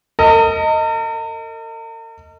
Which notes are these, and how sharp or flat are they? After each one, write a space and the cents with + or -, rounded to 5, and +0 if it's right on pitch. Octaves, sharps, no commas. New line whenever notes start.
A#4 -45 D#5 +10